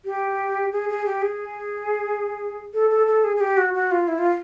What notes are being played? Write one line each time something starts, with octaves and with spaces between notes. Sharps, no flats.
G4
G#4
G#4
G4
G#4
A4
A4
A4
G#4
G#4
G4
F#4
F#4
F4
E4
F4